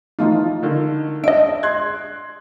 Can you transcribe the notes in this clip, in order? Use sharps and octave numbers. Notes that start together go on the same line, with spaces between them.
E3 F3 A3 D#4 F4
D3 D#3
D4 D#5 E5 D7
C6 F#6 G#6